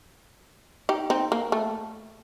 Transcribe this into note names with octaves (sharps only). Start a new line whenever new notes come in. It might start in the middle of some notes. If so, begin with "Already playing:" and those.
D#4 G4
C4 D#4
A#3
A3